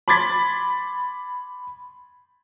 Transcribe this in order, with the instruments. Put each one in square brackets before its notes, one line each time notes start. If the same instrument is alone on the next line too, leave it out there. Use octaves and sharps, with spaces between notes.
[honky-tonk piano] B5 C6 D6 G#6 A6 B6